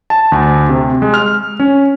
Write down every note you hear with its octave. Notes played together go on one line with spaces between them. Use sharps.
A5
D2
C3
G#3
F6
C#4